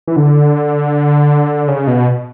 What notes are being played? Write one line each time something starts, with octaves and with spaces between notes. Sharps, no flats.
E3
D3
C#3
B2